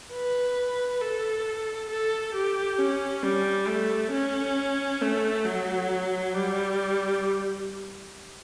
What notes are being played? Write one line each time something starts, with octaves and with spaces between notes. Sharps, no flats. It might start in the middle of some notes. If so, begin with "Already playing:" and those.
B4
A4
A4
G4
C#4
G3
A3
C#4
A3
F#3
G3